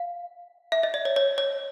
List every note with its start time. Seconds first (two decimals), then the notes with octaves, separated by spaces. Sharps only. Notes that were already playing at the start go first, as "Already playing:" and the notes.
Already playing: F5
0.72 E5
0.83 D#5
0.94 D5
1.05 C#5
1.16 C#5
1.38 C#5